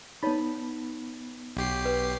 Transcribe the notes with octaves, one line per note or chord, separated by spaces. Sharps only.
B3 D#4 C#5 A5 B5
B1 G4 C7
B4